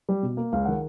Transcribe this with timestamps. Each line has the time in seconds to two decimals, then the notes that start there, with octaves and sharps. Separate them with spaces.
0.09 G3
0.23 B2
0.37 A#3
0.52 C#2 F5
0.65 D#3 F#5